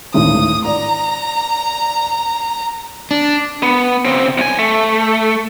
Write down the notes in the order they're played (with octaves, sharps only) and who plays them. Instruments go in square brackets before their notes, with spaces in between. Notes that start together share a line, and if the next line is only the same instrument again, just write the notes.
[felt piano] G#1 D2 A2 [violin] D#6
[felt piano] D5 [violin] A#5
[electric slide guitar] D4
[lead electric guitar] B3
C#3 C4
C2 G#5
A3